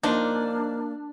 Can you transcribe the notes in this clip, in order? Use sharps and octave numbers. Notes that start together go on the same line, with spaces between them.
F3 A#3 D4 D#4